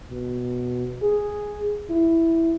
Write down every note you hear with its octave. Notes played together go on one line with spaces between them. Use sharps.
B2
G#4
E4